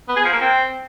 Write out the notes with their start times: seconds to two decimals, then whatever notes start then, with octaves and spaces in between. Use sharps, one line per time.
0.08 B3
0.16 G#4
0.25 F3
0.33 A#3
0.41 C4